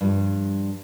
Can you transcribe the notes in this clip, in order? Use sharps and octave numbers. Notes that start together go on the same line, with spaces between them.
G2 F3 G3